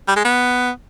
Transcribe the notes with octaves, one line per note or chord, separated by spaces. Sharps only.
G3
G#3
B3